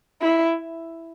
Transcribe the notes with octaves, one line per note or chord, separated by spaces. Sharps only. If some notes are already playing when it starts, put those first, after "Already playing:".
E4